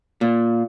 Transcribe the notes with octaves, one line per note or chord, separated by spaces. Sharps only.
A#2